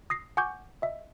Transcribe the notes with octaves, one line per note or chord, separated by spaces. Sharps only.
D#6 A#6 C7
F#5 G#5 C#6 D6 G6
D#5 E5